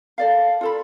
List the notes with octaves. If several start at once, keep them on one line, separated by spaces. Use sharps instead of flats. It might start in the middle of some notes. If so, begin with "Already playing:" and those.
A4 D5 F5
F4 A4 B5